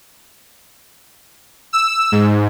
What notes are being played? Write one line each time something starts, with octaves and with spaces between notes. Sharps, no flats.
E6
G#2